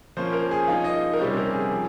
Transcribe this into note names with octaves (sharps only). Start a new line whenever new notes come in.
F3 A#3 C#4 C5
A#4
G#4
F3 A#3 D#4 F4
D#5
A#4
C3 G3 A#3 C#4 C5
A#4
G#4
F3